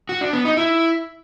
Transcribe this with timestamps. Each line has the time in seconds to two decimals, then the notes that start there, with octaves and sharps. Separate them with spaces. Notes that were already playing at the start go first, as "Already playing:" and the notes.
0.09 F#4
0.21 D4
0.33 B3
0.45 D#4
0.57 E4